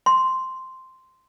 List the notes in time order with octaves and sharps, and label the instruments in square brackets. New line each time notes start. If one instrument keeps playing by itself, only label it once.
[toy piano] C6